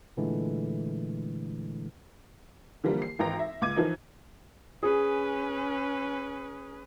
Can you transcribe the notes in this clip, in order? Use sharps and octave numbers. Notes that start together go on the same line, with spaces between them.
A#2 D3 E3 G#3 A3
D3 E3 F3 G3 A#3
C7
G#1 E3 G5 A#5 A#6
E5
C#2 D6 G#6 D#7
E3 F3 D#4
C#4 G#4 B4